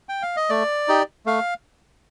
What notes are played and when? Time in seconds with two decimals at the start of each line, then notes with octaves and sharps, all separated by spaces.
0.09 G5
0.22 F5
0.37 D#5
0.49 A3 D5
0.88 D#4 G4
1.26 A3 F5